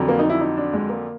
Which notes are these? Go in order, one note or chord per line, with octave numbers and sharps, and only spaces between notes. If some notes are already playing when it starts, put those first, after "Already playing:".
Already playing: F2 D3 F#3
A#3
D#4
E4
D#4
D4
G#3
A#3